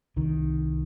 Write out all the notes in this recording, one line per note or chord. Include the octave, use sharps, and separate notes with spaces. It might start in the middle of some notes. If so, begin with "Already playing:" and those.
C2 D#3